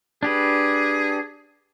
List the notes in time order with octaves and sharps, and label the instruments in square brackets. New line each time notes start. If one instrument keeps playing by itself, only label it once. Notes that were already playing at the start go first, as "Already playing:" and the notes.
[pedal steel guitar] D4 G4 B4 [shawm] G#4